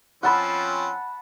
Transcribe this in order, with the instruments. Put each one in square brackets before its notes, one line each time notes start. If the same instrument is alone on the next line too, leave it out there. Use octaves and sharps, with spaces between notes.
[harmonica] F3 C4 C#4 [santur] F#5 A5 B5